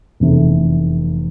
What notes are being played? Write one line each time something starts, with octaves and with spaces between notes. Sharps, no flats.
F1 E2 C3 E3 A3